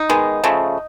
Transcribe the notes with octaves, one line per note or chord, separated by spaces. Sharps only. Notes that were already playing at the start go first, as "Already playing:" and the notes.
Already playing: D#4
D#3 G#3 B3
C#3 F3 A3